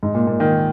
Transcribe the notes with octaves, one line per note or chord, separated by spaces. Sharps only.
G#2
A#2
A#2
D#3